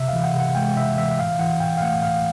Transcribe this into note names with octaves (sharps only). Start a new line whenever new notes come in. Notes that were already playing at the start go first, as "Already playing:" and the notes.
Already playing: C3 E5
E3 F5
F#5
C3
F#5
G#3 G5
C3 E5
E3 E5
E5
A2 F5
E3 F#5
A2 G5
F5
A3 F#5
A2 F5